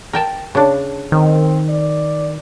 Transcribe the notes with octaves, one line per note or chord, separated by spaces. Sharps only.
A#4 G5 A5
C#3 D4
D#3 C4
D5